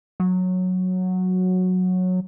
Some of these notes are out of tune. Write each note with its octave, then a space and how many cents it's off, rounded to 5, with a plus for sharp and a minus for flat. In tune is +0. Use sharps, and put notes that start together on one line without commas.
F#3 -10